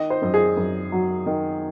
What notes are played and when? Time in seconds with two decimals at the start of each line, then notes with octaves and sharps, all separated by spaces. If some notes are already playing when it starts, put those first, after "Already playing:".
Already playing: D#3 D#5
0.10 C5
0.22 F#2
0.34 G#4
0.57 F#2
0.92 F#3
1.26 D#3